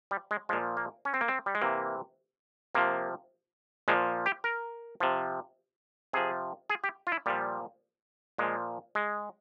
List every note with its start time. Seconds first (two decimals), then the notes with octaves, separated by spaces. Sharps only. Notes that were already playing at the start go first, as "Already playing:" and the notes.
0.11 G3
0.31 G#3
0.49 A#2 F3 G#3
0.77 A#3
1.05 C#4
1.14 C4
1.21 A#3
1.28 C4
1.46 G3
1.55 G#3
1.62 C3 E3 A#3
2.75 C3 F3 A#3
3.88 A#2 F3 G#3
4.26 G4
4.44 A#4
5.00 C3 F3
6.13 C3 F3 G#4
6.70 G#4
6.84 G4
7.07 F4
7.12 E4
7.26 A#2 F3 G3
8.38 A#2 F3 G#3
8.95 G#3